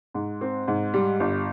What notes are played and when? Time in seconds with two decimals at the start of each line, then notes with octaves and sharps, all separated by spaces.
0.14 G#2
0.41 C4
0.68 G#2
0.94 G3
1.20 G1